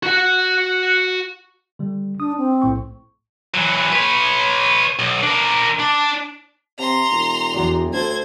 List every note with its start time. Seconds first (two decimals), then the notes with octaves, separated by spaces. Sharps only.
0.03 F#4 F#5
1.79 D3 G3
2.20 D4 D#6
2.38 C4
2.62 A#1 A2 C#6
3.54 E3 F#3
3.92 B4 C#5
4.99 B1
5.23 D4 A#4
5.80 D4
6.79 C3 A#5 C6
7.11 E1
7.54 E2 F#4 D5
7.93 D2 A4 C5 G#6